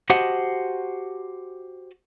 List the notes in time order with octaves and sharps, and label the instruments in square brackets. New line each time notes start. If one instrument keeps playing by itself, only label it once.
[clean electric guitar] F#4 G4 C5 D#5 F#5 A5